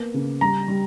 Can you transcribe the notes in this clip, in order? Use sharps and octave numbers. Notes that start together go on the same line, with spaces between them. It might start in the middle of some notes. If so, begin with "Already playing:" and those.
Already playing: A#3 B3
C#3
G3 A#5
G3